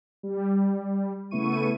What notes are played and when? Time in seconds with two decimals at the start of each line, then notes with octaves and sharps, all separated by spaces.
0.23 G3
1.31 C#3 A3 B3 E4 C#6 D#7